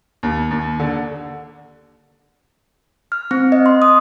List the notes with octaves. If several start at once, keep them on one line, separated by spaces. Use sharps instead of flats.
D#2
D#2
D3
F6
C4
D#5
C6
D#6